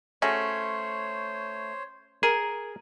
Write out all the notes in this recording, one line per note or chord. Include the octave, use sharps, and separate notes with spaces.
A3 C#4 F#4 G#4 C5 C#5
G#4 A#4